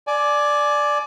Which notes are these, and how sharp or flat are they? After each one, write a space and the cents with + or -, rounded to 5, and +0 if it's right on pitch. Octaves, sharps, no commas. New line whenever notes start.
D5 +0 G#5 +25